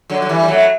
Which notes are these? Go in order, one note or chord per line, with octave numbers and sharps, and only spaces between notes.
D3 F#3
F#3
E3 G3
G3
F#3 A3